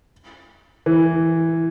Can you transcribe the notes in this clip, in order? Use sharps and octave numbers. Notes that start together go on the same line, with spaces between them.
E3